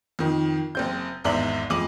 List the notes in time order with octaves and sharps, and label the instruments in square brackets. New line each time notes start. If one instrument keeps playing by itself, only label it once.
[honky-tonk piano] F2 D#3
F#1 C4 G6
G#1 E2 G#2 D5 E5 F#7
F2 G#3 D6 D#7 F#7